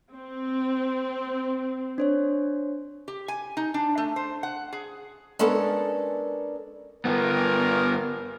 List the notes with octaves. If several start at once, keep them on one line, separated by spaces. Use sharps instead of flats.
C4
D4 C5 C#5
G4
G#5
D#4
D4
A3
C5
F#5
G#4
G#3 B3 C#4 D4 A4 A#4
G2 B3 A#4